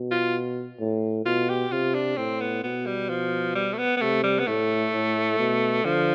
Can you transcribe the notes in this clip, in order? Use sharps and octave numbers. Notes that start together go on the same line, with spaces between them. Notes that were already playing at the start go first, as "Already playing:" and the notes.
Already playing: B2
F4
A2
B2 F4
G4
C3 F4
D4
A2 C4
B3
B2 B3
G3
F3
G3
A3
B3
B3
C3 A3
G3
B3
A2 A3
A2
B2
D3 F3